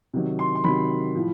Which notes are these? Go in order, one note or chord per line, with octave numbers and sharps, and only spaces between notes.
C3 D#3 F#3
C6
C6
C3 D#3 F#3 B5
A2 F3